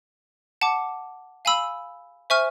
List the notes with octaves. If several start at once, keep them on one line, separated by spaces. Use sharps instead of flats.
F#5 A5 D6
F5 G#5 B5 E6
C5 E5 G#5 C#6 F6